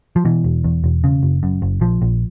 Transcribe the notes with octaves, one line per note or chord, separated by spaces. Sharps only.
F3
B2 E3
E1
E2
E1
C#3
F#1
F#2
F#1
A#1 F3
A#1